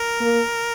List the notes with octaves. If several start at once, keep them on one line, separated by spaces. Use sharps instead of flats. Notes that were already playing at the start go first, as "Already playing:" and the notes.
Already playing: A#4
A#3